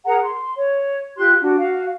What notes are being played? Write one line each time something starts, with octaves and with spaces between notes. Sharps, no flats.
G#4 A#4 F#5 A#5
C6
C#5
F4 G4 C6 F#6
D4 F#4
F#4 F5